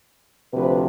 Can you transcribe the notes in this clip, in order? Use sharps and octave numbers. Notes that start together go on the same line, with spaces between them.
D2 C3 F3 B4